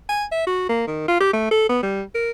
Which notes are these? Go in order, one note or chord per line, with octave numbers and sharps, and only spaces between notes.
G#5
E5
F#4
A#3
D#3
F4
G4
A3
A4
B3
G3
A#4